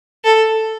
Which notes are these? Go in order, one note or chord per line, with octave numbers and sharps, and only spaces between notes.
A4